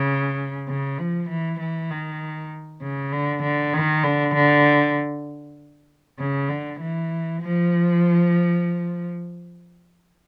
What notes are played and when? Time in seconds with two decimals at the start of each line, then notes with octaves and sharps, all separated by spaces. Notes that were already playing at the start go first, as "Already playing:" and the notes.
Already playing: C#3
0.68 C#3
0.99 F3
1.29 E3
1.60 E3
1.90 D#3
2.81 C#3
3.12 D3
3.43 D3
3.73 D#3
4.04 D3
4.35 D3
6.19 C#3
6.49 D3
6.80 E3
7.42 F3